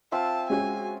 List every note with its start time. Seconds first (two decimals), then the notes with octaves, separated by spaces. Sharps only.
0.12 C4 F4 E5 A5
0.50 G#3 C#4 F#4 G#5